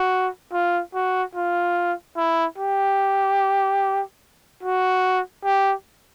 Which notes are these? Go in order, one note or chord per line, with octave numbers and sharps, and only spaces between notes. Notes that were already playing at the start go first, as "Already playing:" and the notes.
Already playing: F#4
F4
F#4
F4
E4
G4
F#4
G4